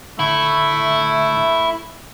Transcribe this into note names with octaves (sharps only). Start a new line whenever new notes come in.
A2 D3 A3 E4